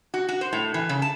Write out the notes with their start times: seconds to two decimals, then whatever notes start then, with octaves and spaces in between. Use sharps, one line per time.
0.14 F#4
0.29 F#4
0.41 C5
0.53 A2
0.74 E3
0.89 C#3
1.02 A5